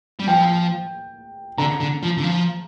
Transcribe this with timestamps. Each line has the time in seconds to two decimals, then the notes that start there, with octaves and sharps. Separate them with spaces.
0.19 G3
0.27 F3 G5
1.58 D3 A#5
1.80 D3
2.03 F3
2.17 D3
2.23 F3